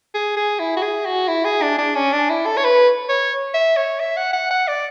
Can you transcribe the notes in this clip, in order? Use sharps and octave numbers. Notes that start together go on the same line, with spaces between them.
G#4
G#4
E4
F#4
G#4
F#4
E4
G#4
D4
D4
C#4
D4
E4
A4
C#5
B4
C#5
E5
C#5
E5
F#5
F#5
F#5
D5